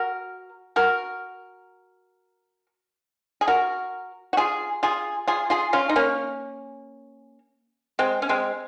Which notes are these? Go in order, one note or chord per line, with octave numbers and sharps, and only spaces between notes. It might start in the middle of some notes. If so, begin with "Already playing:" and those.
Already playing: F#4 A#4
F#4 A#4
G#4
F#4 A#4
F#4
F4 G#4
F4 G#4
F4 G#4
F4 G#4
C#4 F4
D#4
A#3 C#4
G#3 C4
C#4
G#3 C4